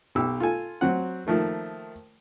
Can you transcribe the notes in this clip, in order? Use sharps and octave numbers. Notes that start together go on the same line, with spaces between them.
B1 G4 E6
F4 A4 G#5
F#3 C4 F#5
D#3 F3 A3 A#3